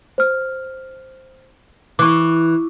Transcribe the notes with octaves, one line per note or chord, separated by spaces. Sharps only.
C5 F6
E3 C#6 D6